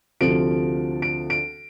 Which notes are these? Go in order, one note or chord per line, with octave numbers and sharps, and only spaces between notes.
D2 C3 F3 D7
D7
D7